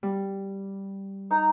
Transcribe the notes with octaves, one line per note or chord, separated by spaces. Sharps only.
G3
D#4 A#5